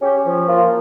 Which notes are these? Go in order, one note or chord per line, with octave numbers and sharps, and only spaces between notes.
C#4 G4
F3
A#3 F4